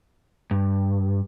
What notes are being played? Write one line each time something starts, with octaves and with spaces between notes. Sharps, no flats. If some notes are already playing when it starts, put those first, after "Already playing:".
G2